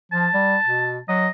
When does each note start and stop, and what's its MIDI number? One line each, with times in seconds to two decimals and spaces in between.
0.12 0.28 53
0.12 1.00 81
0.34 0.56 55
0.65 0.99 47
1.09 1.28 54
1.09 1.29 75